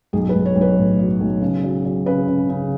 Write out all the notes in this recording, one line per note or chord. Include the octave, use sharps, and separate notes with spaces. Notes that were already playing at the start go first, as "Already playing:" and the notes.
B1 G#4
B4
B1
C#5
B1
B4
A2
F#3
B1
C#3
F#3
F#3
C#3 B4
C#3
C#3